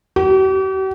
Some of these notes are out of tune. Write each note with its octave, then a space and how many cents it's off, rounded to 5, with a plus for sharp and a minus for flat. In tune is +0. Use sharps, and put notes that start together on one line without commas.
G4 -45